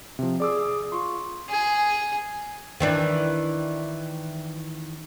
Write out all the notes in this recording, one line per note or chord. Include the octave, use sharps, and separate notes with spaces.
C3 F3
G#4 D5 D6 E6
F4 C6 C#6
G#4
D#3 E3 D4